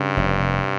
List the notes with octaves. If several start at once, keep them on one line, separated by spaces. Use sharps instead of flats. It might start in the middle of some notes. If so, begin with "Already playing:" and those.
Already playing: G2 C#3
F1
C3